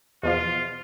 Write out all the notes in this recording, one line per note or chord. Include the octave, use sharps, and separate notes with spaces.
E2 B2 F3 F4